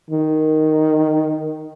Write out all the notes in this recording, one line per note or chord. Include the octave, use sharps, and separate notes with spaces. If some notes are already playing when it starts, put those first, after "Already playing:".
D#3